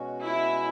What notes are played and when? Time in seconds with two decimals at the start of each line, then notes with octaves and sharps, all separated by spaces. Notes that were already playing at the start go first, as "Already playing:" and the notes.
Already playing: B2 G#3 C#4 F#4
0.24 E4